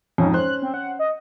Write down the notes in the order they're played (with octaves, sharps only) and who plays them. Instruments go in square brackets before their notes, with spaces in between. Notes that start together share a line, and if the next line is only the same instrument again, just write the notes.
[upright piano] F2 G#2 [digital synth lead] C#4
[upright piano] C#4 C5 [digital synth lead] F#6
[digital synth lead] C4
F#5
D#5